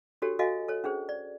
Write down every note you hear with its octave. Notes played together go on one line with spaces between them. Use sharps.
D4 F#4 G4 A4 C#5
F#4 A4 D#5 F5 G#5
A4 C#5
C#4 D4 G#4 C5
D5